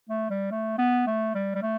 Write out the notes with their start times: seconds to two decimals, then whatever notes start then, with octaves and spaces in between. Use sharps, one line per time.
0.09 A3
0.30 G3
0.51 A3
0.78 B3
1.07 A3
1.35 G3
1.55 G3
1.62 A3